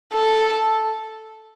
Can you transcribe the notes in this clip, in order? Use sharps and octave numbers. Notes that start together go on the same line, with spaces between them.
A4